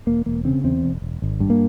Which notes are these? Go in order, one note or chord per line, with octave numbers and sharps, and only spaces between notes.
E1 A#3
E1 A#3
C#3 C4
E2 C4
E1
E1
G#1
G2
A#3